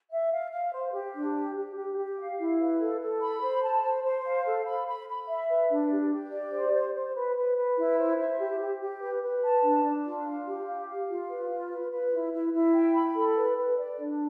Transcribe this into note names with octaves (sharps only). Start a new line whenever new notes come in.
E5
F5
F5
C5
G4
D4
G4
G4
G4
G4
F5
E4
B4
A4
A4
B5
C5
A5
C5
C5
F5
A4
B5
B5
B5
E5
B4
D4
G4
G4
D5
C5
C5
C5
B4
B4
B4
E4
C5
E5
G4
G4
G4
B4
B4
A5
D4
D4
F4
F5
G4
F5
F5
F4
B4
F4
B4
B4
E4
E4
E4
G5
B5
A4
B4
B4
D5
D4